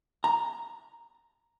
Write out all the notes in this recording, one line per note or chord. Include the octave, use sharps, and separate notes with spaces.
A#5